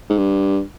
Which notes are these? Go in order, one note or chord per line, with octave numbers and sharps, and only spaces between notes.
G#2
G2